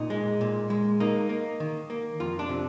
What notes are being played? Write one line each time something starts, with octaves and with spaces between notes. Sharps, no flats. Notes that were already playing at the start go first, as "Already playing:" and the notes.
Already playing: A#2 D#4
G#3
A#2
G#3
A#3 D#4
A#3
D#3
A#3
F2 F4
D4
C3